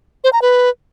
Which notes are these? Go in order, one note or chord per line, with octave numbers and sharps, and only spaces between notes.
C5
A#5
B4